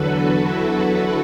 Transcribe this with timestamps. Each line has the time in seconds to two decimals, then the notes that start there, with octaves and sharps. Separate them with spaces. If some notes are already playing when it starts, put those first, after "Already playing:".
Already playing: E2 D3 F#3 F#4 A4 B4
0.42 E4